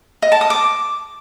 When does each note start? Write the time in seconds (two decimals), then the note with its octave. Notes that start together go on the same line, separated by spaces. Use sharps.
0.22 D#5
0.32 A5
0.41 D#6
0.50 D6